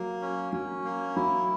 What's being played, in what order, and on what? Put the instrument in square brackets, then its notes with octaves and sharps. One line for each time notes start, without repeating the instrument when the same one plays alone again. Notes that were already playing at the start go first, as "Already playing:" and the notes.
Already playing: [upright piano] F#3 [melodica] A#3
[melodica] C#4
[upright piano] F#3 [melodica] C#4
[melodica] A#3
[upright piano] F#3 [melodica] E4